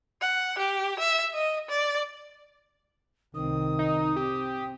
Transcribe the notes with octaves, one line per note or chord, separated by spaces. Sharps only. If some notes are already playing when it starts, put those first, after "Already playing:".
F#5
G4
E5
D#5
D5
C2 D#3 C4 D#6
D#4
C4 G4